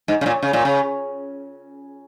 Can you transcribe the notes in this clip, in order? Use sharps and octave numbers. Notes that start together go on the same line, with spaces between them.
G#2
C#3
A#2
C#3
A#2
C#3